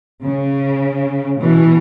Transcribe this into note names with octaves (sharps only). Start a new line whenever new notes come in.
C#3
B2 E3